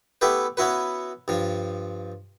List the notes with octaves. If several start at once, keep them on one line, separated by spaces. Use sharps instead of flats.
A3 B3 E4 G4 B4
B3 C#4 E4 F#4 B4
G2 F3